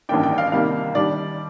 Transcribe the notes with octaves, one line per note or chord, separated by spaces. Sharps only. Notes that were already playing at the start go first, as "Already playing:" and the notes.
A1 G2 D#3 A#3 D4 G5
G5
F5
C2 C3 D#3 G3 A#3 F5
D#2 D#3 G3 D4 D5